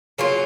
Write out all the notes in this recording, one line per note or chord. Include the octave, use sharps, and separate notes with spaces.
C#3 F#3 A#3 F4